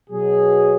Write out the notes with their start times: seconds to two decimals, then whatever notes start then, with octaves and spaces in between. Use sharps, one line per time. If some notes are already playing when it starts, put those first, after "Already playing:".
0.10 B2 F#3 G#4